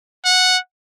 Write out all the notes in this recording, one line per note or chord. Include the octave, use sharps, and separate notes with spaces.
F#5